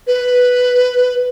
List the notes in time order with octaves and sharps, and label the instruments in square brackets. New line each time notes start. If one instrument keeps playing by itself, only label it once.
[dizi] B4